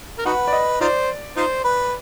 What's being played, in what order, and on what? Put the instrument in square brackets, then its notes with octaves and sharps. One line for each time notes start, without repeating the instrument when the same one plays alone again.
[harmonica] A#4
[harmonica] D#4 F#4 B4 [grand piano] F#5
[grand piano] D5
D#5
[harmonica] D#4 F4 C5 [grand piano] D5
[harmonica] D#4 F4 C5
B4